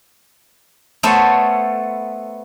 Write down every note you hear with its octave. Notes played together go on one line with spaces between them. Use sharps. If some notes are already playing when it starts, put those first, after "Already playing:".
A3 B3 A4 C5 C#5